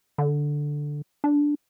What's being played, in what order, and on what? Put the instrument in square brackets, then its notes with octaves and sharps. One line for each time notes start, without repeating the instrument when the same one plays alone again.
[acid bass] D3
D4